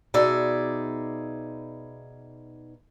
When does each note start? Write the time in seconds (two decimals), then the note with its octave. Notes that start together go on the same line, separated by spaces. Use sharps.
0.14 B2 D#4 G#4 D5 E5